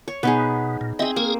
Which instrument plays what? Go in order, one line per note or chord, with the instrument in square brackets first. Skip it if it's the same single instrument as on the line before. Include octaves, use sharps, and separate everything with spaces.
[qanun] C#5
[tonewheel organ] B2 [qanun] B3 D#4 G#4
[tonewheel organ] A#2
[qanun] C4 G#4 [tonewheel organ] D#5 E5
[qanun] A#3 [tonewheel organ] G#4 A#4